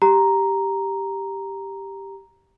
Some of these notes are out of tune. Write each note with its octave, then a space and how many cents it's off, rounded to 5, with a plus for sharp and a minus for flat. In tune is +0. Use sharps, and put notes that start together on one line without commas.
G4 +0 A#5 +0